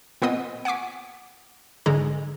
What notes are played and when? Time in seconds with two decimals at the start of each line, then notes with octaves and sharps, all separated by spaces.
0.22 A#2 B3 C4 C5 D#5 D#6
0.65 F#5 G#5 C#6 D6 B6
1.86 A1 G#2 D3 G#3 A#5